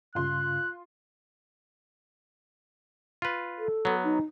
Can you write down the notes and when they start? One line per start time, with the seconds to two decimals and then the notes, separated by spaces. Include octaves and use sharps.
0.15 G2 C#3 F4 C6 F#6
3.22 F4 B4
3.58 A4
3.85 F#3 B3
4.03 D#4